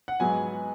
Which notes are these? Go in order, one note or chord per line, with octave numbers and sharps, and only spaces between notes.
F#5
G#2 F#3 B3 G#5